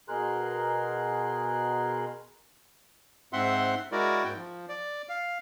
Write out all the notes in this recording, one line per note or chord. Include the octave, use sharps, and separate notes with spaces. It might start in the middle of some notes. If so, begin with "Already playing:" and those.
B2 G#4 A#4 C6 F#6
G#2 C4 E5 F#5 C6
G#3 E4 F#4 A#4 D5
G#2 G5
F3
D5
F5